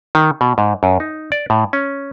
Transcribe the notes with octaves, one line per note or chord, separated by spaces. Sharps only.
D#3
B2
G#2
F#2
D#4
D5
A2
C#4